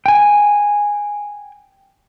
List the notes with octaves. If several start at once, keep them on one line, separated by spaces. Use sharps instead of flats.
G5 G#5